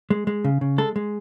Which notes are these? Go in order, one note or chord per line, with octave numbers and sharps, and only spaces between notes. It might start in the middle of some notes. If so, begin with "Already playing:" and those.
G#3
G#3
C#3
C#3
G#3 A4
G#3